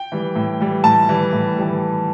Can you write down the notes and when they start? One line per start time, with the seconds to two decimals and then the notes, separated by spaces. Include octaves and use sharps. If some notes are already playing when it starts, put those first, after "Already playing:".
Already playing: G5
0.12 E3 G3
0.35 A2
0.61 E3 G3
0.84 A2 A5
1.09 E3 G3
1.33 A2
1.58 E3 G3